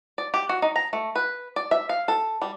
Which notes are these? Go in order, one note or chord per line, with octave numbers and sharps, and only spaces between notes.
D5
G4
F#4
D#4
A#5
A3
B4
D5
E5
F5
A4
G3